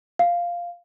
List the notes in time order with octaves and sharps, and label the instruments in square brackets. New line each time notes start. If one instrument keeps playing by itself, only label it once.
[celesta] F5